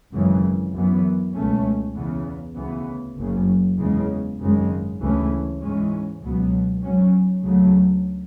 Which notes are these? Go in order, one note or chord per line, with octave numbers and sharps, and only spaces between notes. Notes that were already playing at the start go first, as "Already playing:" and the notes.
G#1 F#2 C#3 E3
F#2 E3 B3
C#2 B2 A3 C#4
E2 C#3 E3 B3
D2 C#3 E3 B3
F#1 F#2 C#3 F#3
E2 C#3 G#3
G#1 F#2 C#3 G#3
D2 C#3 E3 A3 C#4
G#2 E3 G#3 C#4
C#2 B2 F#3 B3
G#2 F#3 C#4
D2 C#3 F#3 A3